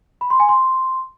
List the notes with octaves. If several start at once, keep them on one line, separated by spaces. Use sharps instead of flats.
B5
C6
G#5
C6